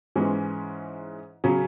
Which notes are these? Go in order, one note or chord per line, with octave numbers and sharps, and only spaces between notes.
G#2 E3 G#3 C#4
C#3 F#3 C#4